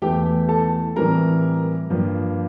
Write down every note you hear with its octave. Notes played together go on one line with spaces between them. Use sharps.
E2 E3 A3 G4 G5
A4 A5
A2 E3 G3 C4 A#4 A#5
G2 F3 A#3